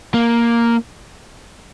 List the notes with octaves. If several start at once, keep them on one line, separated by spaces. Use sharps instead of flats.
A#3